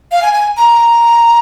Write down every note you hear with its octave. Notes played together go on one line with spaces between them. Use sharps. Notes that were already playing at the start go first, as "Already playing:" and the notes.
F5
G#5
G#5
A#5